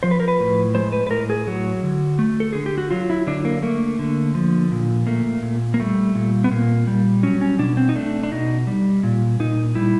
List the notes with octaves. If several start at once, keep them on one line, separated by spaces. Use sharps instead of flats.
F3 C5
B4
A#4
B4
A2
G#3 C5
B4
B4
A2 A#4
G#4
F#3 F#4
D3
A3
A4
D3 G#4
G4
F#4
F#3 F4
E4
D3 D4
A#3
A3 A#3
D3
F3
A#2
A3 A#3
A#2
A#3
G3 A3
A#2
B3
A#2 A#3
G3
F#3 C#4
C#4
B2 D4
C4
D#4
A3 D4
D4
B2 D#4
G3
A#2
A#2 D#4
G3 E4